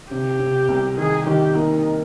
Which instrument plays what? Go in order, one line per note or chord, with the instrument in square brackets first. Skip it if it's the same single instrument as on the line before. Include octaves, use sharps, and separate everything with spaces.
[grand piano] C3 [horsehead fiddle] G4
[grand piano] C3
C2
[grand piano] D#3 [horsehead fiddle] G#4
[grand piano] D#3 [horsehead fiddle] G4
[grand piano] A#3 [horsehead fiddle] D#4